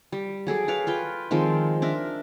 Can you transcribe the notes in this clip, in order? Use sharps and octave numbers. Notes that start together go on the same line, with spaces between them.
G3
F#3 G#4 A4 D5
B4 C#5 D5 F5
F4 B4 G5
D#3 F3 G#3 C4
D4 A#4 E5